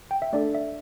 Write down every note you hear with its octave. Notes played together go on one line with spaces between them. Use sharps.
G5
E5
A3 D4 A4 D5
E5